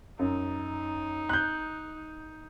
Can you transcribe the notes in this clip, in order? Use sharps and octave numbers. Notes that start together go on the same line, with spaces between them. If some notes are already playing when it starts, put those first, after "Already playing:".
F#2 D#4
F#6 G6